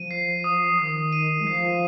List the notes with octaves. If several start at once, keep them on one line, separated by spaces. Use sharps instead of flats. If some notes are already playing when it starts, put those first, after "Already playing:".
Already playing: F3 D#7
C7
D#6
D#3 D#6
D#7
G#3
F3 C7